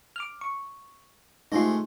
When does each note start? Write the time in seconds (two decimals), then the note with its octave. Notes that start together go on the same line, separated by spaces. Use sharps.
0.16 D6 F6
0.41 C#6
1.52 C3 G#3 A3 D#4 F4